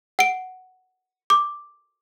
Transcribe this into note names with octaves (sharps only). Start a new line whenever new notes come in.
F#5 D7
D6